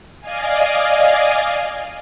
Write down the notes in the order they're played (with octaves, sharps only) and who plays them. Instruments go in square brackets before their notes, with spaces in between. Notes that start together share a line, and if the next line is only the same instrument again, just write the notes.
[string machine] D5 D#5 F5 G#5